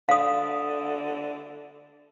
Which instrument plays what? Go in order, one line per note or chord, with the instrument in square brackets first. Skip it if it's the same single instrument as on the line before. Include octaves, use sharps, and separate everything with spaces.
[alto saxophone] D3 [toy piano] F5 D#6